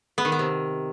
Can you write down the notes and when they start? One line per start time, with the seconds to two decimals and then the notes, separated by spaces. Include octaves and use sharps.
0.18 B3
0.25 D#3
0.32 B3
0.39 C3